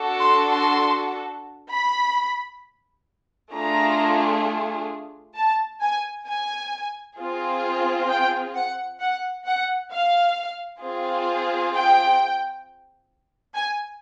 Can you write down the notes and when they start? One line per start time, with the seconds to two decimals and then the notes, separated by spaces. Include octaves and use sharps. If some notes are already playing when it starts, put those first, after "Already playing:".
Already playing: D4 F#4 A4
0.19 C6
0.50 C6
1.71 B5
3.53 A3 D4 F4 G#4 A#5
5.36 A5
5.81 G#5
6.27 G#5
7.19 C4 F4 G#4
8.09 G5
8.55 F#5
9.00 F#5
9.46 F#5
9.91 F5
10.83 C4 F4 G#4
11.74 G5
13.55 G#5